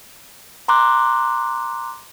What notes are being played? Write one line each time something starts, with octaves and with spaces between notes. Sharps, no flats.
A#5 C6 D6 F#6